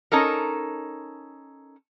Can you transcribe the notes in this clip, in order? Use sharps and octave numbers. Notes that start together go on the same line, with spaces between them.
C#4 D#4 A4 A#4